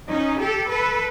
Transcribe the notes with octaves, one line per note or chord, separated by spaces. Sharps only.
C#4 D#4
G4 A4
A4 B4